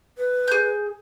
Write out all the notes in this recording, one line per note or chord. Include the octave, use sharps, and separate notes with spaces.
B4
G#4 G6